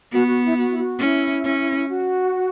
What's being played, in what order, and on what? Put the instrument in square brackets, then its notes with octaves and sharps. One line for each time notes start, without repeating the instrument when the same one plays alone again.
[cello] B3 [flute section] F#4
[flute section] F#4
E4
F#4
E4
F#4
[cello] C#4 [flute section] E4
[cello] C#4
[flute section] F#4